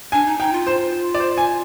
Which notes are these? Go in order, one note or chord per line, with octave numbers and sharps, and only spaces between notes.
D4 G#5
D#4
D#4 G5
F4
C5
D5
C5
G#5